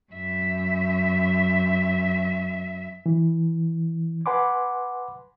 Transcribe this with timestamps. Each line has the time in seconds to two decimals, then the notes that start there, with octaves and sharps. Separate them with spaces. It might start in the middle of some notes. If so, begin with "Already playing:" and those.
0.12 F#2 E5
3.06 E3
4.26 B4 F#5 G#5 B5 C6 D6